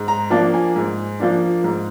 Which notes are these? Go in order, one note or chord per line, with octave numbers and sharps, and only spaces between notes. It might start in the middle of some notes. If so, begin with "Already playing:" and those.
Already playing: G#2
A#5
F3 A#3 D4 A5
G#5
G#2
F3 A#3 D4
G#2